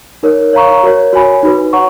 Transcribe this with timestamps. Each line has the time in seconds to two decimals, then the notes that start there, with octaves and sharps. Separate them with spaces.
0.23 D#4 A#4 C#5
0.53 C#5 F5 A#5 C#6
0.83 F#4 A#4 C#5
1.13 F#4 C#5 G#5 B5
1.43 D#4 F#4 B4
1.73 C#5 F#5 A#5 C#6